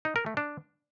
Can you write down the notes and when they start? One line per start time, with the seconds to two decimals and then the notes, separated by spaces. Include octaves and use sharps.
0.05 D#4
0.16 A#4
0.26 A3
0.37 D4